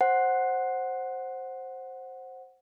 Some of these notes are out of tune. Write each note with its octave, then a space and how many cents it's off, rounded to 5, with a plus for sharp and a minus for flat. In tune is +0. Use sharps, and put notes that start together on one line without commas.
C5 +10 F#5 +0